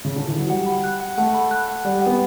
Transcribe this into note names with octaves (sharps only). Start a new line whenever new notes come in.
C#3
D3
E3
F#3
G3 F#5
B5
F#6
F#5
A3 F#5
B5
F#6
F#5
G3 D5
B3 F#5